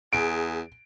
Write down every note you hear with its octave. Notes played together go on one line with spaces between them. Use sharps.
E2 G#4 D7